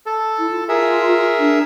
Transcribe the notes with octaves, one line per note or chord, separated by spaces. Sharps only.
A4
E4
F4
G#4 A#4 E5
D4